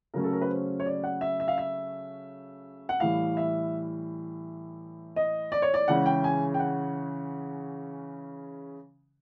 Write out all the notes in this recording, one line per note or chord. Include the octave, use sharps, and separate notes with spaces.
C#3 F#3 A3 C#4 A#4
A4
A#4
B4
C5
C#5
D5
F#5
E5
E5
F5
E5
F#5
A2 E3 G3 F5
E5
D#5
D5
C#5
D5
C#3 E3 G#3 C#4 F#5
G5
G#5
G5
F#5